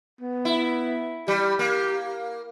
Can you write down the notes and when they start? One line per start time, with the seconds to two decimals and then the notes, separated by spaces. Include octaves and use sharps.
0.21 B3
0.45 E4
1.28 G3 G4
1.59 A#3